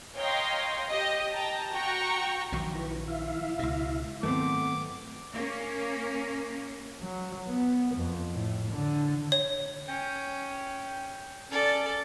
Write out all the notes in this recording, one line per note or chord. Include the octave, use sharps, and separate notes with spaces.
C#5 D#5 F5 G5 A#5 C6
G4 D#5
G5 A5 A#5
F#4 G5 A#5 C#6
A#1 D#3 F#3
E4 B4
E4 E5 F5
C#2 B2
G#2 D#3 F#3 A3 B3 C4 D6
A#3 C#4
F#3
B3
F2
A2
D3
C#5
C#4 G5
C#4 A4 D5